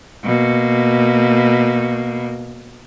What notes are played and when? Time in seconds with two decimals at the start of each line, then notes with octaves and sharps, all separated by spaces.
0.24 B2 A#3